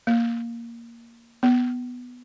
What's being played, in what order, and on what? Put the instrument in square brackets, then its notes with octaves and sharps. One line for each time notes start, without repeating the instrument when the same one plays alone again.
[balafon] A#3
B3